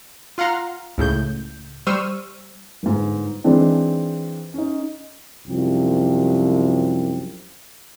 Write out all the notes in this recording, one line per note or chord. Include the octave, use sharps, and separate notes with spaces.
F4 F5 F#5 A#5 C6 F6
C#2 A2 C#3 G6
G3 C5 C#6 E6 F6 D#7
G1 G#2
E3 G#3 C4 D4 D#4
C#4 D#4
C2 F#2 F3 G4